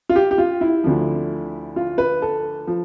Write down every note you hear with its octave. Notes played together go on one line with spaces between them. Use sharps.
F4
G4
G4
F4
E4
D2 D3 F3
F4
B4
A4
F3